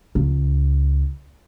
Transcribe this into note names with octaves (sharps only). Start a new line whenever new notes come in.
C#2